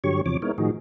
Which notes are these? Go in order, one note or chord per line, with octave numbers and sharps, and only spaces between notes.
G2 D3 F#3 G4 C#5 C#6
E2 C3 F3 C#5 D6
G#3 B3 D#4 E4 A#4 C#5
A2 D#3 F3 D#4 F#4 G#4